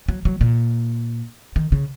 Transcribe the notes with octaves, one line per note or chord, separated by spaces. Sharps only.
F#3
F#3
A#2
D#3
C#3